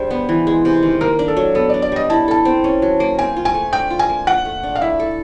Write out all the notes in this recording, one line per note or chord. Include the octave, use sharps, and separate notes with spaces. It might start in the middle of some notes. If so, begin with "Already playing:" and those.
Already playing: G3 G#3 D4 C5
B3
E3
G#3
C3
D#3
A#3 A#4
D4
A4
F#3
B3 A4
D5
D4
D5
G3 D#5
E4 A5
A4 A5
C4
C#4
F#3
A#3
C4 G#5
F4
G#5
A3
D4 G5
F4
G#5
A#3
F4 F#5
A3
D4
F5
E4 E5
A4